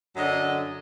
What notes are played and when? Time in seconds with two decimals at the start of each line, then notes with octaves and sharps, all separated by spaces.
0.16 F#2 D3 F#3 D4 D#5